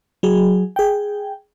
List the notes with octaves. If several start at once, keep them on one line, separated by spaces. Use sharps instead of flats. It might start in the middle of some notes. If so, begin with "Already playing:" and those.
F#3 G#4
G#4 G5